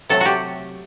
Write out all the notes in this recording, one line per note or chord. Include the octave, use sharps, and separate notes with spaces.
C3 F#3 A3 A4
F#4 G4